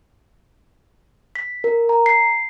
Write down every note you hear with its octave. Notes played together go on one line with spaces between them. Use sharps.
B6
A#4
A#5
C7